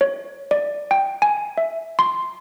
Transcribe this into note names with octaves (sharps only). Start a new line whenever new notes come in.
C#5
D5
G5
G#5
E5
C6